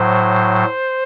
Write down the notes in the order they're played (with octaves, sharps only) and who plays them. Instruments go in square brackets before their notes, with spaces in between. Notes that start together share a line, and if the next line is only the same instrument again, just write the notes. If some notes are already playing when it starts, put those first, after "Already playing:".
Already playing: [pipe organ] A2 F#3 C5